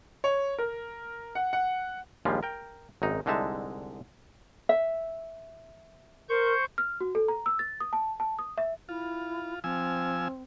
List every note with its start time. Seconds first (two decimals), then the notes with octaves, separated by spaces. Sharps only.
0.24 C#5
0.58 A#4
1.35 F#5
1.53 F#5
2.25 A#1 D#2 F3 G3 G#3 F4
2.43 A#4 G5
3.02 G#1 F#2 D#4
3.26 C2 D3 G#3 D#4 E5 A5
4.69 E5
6.29 A#4 C5 C#6 G6
6.78 F6
7.01 F#4
7.15 A4
7.28 A#5
7.46 E6
7.59 A6
7.80 D#6
7.93 A5
8.20 A5
8.39 D#6
8.58 E5
8.89 E4 F4
9.64 F3 C4 G#5 E6